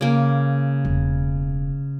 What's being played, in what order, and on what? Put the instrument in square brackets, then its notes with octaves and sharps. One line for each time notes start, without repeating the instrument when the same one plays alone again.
[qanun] C#3 A#3
[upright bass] E1